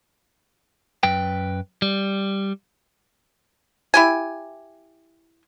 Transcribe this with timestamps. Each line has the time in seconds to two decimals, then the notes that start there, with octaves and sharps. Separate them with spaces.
1.03 F#2 B4 G5
1.82 G3
3.94 E4 G4 G#5